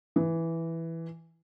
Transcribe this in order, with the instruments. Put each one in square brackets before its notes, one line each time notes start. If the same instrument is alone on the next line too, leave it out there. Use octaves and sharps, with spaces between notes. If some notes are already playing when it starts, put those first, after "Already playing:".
[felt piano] E3